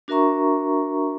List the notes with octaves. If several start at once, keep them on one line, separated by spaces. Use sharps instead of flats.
D4 F#4 A#4 E5 A#5 C#6